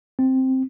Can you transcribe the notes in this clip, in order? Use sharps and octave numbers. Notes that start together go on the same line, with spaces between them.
C4